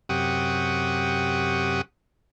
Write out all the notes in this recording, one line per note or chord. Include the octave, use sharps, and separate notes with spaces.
F#2 C3 G4 F#5 C#6 D#6